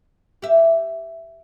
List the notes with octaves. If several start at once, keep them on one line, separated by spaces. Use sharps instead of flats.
G4 E5